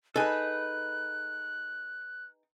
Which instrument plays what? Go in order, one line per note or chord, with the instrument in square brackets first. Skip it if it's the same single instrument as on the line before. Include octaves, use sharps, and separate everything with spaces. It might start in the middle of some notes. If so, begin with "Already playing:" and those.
[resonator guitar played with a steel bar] D#4 G#4 B4 [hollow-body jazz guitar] A4 G#5 [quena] F#6